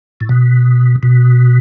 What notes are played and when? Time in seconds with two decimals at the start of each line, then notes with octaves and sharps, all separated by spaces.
0.21 A2
0.29 B2
1.03 B2